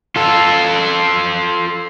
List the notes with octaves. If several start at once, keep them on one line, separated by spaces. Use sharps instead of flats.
F4 A4